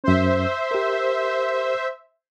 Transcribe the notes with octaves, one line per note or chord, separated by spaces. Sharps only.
F#2 C#4 C5 E5
G4 A#4